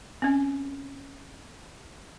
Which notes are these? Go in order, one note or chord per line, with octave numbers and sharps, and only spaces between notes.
C4 C#4